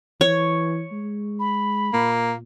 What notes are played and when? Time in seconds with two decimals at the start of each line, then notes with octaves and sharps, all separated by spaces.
0.21 E3 C#5
0.92 G#3
1.40 B5
1.93 A#2 A#3